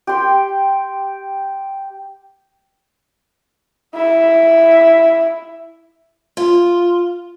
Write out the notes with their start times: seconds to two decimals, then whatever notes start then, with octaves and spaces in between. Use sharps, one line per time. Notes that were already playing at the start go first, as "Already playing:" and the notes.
0.07 G4 C6
3.95 E4
6.37 F4